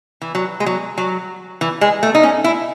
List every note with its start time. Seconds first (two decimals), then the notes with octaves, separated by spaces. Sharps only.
0.21 E3
0.35 F#3
0.60 G#3
0.66 F#3
0.98 F#3
1.61 E3
1.81 G#3
2.03 A3
2.15 D#4
2.23 C#4
2.44 E4